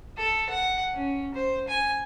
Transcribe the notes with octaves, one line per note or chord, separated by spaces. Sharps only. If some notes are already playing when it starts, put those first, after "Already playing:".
A4
F#5
C#4
C5
G#5